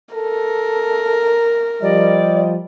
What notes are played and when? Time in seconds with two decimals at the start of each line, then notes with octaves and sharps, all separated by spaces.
0.15 A4 A#4
1.82 F3 G3 D5 D#5